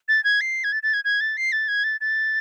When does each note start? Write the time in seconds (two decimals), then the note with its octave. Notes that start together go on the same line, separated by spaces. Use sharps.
0.08 A6
0.24 G#6
0.41 C7
0.64 G#6
0.72 A6
0.83 A6
0.94 G#6
1.04 G#6
1.21 A6
1.37 C7
1.52 A6
1.68 G#6
1.84 A6
2.01 A6